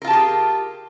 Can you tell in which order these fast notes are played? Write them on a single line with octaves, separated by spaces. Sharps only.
A#4 F4 A5 G4 G#4